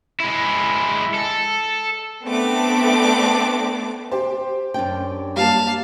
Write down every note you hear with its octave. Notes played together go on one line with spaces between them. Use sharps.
G#3 E4
A4
A3 B3 C4 D4 D6
G4 C5
F#2 D4 G5
G3 A#3 F5 A5